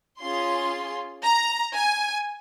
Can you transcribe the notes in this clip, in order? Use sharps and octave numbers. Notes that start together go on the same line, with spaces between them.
C#4 F4 G#4 C6
A#5
G#5